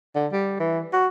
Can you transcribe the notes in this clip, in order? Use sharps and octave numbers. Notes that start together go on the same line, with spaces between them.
D3
G3
E3
F#4